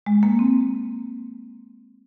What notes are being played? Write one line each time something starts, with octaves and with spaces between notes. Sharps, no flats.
G#3
A#3
C4